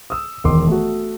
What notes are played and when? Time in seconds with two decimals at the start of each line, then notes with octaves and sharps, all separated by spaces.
0.10 D#6 E6
0.44 E1 D#3 C6 D6
0.67 A3 F#4